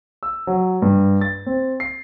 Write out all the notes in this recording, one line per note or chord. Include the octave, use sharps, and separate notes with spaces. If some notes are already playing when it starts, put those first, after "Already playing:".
E6
F#3
G2
A6
C4
C7